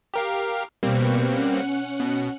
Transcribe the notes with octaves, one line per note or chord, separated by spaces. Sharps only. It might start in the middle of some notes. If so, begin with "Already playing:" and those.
G4 A#4 F5
B2 G3 A#3 C4 B4 C#6
C#4 F#5
B2